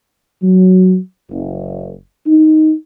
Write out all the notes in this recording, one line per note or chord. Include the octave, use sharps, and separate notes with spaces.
F#3
F#1
D#4